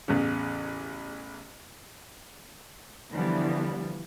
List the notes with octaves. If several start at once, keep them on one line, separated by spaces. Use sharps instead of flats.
A1 E2 C#3
D3 E3 F3 G3 B3